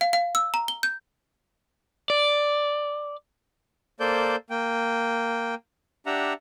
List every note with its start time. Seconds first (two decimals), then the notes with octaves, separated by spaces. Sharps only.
0.01 F5
0.13 F5
0.35 E6
0.54 A#5
0.68 G7
0.83 G6
2.10 D5
4.00 A#3 A4 C5 D5 G6
4.50 A#3 G5
6.06 D4 G4 E5 F#5 A#5